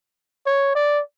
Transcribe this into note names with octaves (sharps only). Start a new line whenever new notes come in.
C#5
D5